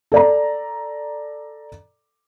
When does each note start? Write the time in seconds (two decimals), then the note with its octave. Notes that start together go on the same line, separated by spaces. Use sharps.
0.12 A4 D5 A#5